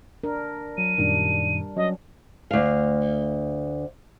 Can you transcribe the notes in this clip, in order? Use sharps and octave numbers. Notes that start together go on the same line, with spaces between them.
D4 A#4
F#3 D#7
F#2 A#2 D#3 G3 D4
F#3 C#4 D#5
D2 F5